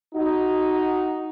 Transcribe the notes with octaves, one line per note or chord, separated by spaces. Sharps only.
D#4 F#4